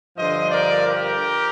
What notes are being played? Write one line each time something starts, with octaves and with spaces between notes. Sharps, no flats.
G2 D3 F3 C5 D#5
A#4 D5
G4 A#4